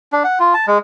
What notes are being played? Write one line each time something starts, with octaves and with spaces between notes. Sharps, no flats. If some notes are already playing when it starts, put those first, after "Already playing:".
D4
F#5
F4
A5
G#3